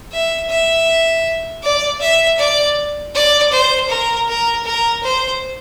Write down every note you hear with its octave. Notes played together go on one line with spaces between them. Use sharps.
E5
E5
D5
E5
D5
D5
C5
A#4
A#4
A#4
C5